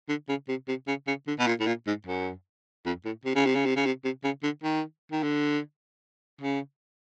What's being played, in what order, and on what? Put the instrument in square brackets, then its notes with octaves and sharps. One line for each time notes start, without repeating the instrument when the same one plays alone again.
[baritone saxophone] D3
C#3
C3
C3
C#3
C#3
D3
B2
A#2
A2
A#2
G#2
F#2
F2
A2
C3
C#3
C3
C#3
C3
C#3
C3
C3
C#3
D3
D#3
D#3
D3
C#3